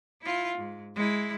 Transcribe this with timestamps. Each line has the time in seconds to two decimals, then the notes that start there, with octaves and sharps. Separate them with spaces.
0.22 E4 F4
0.57 G#2
0.95 G#3 E4